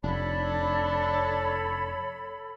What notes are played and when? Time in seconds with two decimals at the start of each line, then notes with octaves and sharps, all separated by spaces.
0.04 F1 D4 A4 C#5 B5